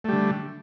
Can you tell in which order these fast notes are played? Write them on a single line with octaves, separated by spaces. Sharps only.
A3 G3 D3